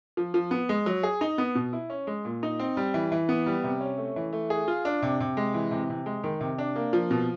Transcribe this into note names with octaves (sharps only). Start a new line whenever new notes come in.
F3
F3
B3
G#3
F#3
G#4
D#4
B3
B2
E4
C#4
G#3
A#2
D#4
C4
G3
E3
E3
B3
G3
C3
C#4
A3
E3
A3
G#4
F4
D4
C3
C3
G#3
E3
C3
C3
G#3
D#3
C3
D4
A#3
F3
B2